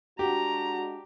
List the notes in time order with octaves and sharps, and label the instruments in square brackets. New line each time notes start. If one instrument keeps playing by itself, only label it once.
[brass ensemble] G#3 D4 F#4 [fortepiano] G4 [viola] A#5